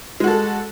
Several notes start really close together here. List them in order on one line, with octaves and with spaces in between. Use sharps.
G#3 F#4 A4